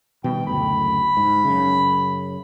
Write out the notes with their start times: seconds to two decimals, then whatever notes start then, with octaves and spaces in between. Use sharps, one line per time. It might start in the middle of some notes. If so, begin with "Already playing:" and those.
0.24 B2 D#3 G3 G5
0.47 F#1 D2 B5
1.17 G#2
1.44 F#2 C#3